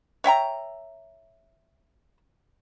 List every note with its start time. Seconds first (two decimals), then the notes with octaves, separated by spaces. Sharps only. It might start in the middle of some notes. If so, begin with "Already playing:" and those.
0.24 C#5 E5 G5 A#5